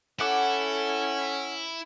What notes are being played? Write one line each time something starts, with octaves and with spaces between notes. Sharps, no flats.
C#4 E4 A4 F#5 D6